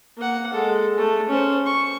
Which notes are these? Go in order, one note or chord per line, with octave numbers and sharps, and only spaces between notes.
A#3 F#5
G#3 A4
A3
C#4 C5
C#6